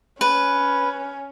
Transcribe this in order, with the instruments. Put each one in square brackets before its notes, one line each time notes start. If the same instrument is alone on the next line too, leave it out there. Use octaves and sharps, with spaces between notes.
[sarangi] C#4 [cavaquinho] B4